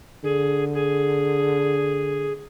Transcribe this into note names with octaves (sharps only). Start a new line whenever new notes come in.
D3 G#4
G#4